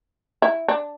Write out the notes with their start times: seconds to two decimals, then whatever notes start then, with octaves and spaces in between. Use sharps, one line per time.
0.42 E4
0.68 D4